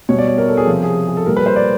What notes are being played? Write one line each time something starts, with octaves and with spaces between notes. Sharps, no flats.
B2 G3 C#5
D5
C#5
A#4
A4
G#4
C3 F3
G#4
G#4
A4
A#2 G3 A#4
B4
C5
D5